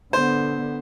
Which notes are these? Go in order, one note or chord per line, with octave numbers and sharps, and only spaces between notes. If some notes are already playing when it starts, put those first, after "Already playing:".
D3 B3 C5